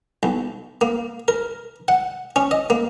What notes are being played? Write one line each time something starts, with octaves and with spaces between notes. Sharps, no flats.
B1
A#3
A#4
F#5
C#4
D#5
A#3